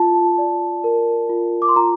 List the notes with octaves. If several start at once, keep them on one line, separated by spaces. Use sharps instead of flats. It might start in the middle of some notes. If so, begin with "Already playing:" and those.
Already playing: F4 A5
D5
A#4
F4
D6
C6
F4 A#5